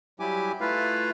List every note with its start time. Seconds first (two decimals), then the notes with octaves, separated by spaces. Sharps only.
0.20 F#3 G3 E4 G4 G#5 D6
0.61 A3 E4 F4 B4 F5